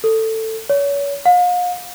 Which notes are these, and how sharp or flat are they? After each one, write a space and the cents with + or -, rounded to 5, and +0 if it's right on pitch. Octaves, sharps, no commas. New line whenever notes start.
A4 +15
C#5 +30
F5 +40